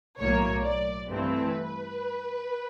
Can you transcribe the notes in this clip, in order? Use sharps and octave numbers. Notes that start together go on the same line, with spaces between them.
B1 A2 F#3 A#3 C#5
D5
G2 E3 A3 C4 B4